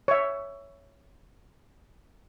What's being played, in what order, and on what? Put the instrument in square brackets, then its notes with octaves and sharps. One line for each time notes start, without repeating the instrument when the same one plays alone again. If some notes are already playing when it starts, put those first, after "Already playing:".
[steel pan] C#5 E5